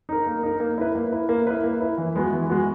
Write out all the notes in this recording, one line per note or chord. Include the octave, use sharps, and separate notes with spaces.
D#4 A#4
A#3
D#4 A#4
A#3
E4 B4
A#3
E4 B4
A#3
E4 B4
A#3
E4 B4
E3
G#3 B3 F#4
E3
G#3 B3 F#4